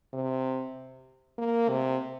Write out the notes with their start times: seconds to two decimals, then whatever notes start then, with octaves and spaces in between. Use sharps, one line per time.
0.14 C3
1.38 A#3
1.69 C3